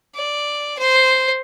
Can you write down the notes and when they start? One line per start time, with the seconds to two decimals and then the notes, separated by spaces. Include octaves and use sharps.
0.15 D5
0.78 C5